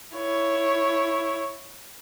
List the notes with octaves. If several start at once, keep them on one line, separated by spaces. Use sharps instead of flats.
E4 C#5